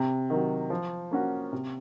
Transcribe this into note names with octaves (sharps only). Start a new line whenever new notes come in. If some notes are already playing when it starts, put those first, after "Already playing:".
Already playing: C3
D#3 F#3
F3
A#3 C#4 F#4
C3